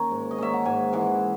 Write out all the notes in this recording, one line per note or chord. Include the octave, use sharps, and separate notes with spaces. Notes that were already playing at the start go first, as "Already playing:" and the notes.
Already playing: D#3 A#3 C#4 A#5
G#2
D#5
D#3 A#3 C#4 E5
F#5
G#2 G#5
E3 G#3 F#5